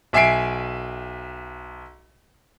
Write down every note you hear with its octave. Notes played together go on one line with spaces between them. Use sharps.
B1 E5 G#5 C7 D7